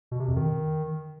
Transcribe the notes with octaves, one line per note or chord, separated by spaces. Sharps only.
B2
C3
F2
D#3